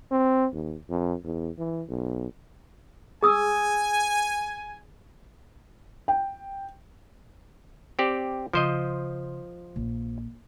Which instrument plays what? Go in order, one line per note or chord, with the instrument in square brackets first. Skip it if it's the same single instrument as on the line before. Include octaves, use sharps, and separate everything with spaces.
[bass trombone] C4
D#2
F2
E2
E3
B1
[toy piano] G#4 D#6 E6 [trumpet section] G#5
[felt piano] G5
[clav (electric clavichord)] C4 G4 D5
[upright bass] C#3 [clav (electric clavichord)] F3 C5 D#5
[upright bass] A#1